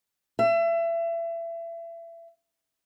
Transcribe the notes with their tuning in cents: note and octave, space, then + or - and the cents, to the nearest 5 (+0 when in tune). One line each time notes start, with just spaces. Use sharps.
E5 +30